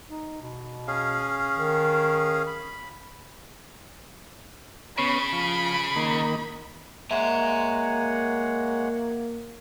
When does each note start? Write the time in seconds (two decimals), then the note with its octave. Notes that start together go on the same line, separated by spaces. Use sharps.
0.10 D#4
0.42 B2
0.88 C#4 G#4 F5
1.55 D#3
2.47 B5
4.98 C#3 B3 C#4 C#5 B5
5.33 F3
5.96 D#3 A#3
7.11 G#3 A#3 C#5 E5 F#5 G#5 A#5